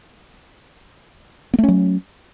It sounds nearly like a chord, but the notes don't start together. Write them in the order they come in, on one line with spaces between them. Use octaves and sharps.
B3 A3 C#4 F#3